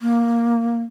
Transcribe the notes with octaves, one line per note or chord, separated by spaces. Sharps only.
A#3